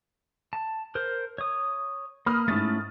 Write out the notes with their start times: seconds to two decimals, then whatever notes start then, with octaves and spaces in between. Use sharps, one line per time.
0.53 A5
0.95 A#4 C5
1.38 C#5 D#6
2.26 A#3 B5 D#6 F6
2.48 G#2 A3 C#4 E4 A6